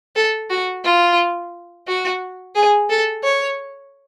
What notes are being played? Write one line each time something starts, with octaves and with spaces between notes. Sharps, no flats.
A4
F#4
F4
F#4
G#4
A4
C#5